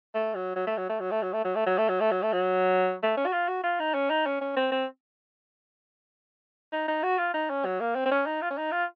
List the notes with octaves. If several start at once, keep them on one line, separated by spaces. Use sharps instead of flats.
A3
F#3
F#3
A3
F#3
A3
F#3
A3
F#3
A3
F#3
A3
F#3
A3
F#3
A3
F#3
A3
F#3
A3
C#4
F#4
F4
F#4
F4
D#4
C#4
D#4
C#4
C#4
C4
C4
D#4
D#4
F#4
F4
D#4
C#4
F#3
A#3
C4
C4
C#4
D#4
F4
C#4
D#4
F4